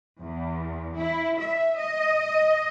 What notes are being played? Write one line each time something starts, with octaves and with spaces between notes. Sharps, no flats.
E2
E4
E5
D#5